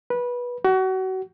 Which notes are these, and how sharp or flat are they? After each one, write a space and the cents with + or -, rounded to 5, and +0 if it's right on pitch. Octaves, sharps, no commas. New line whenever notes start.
B4 -20
F#4 +30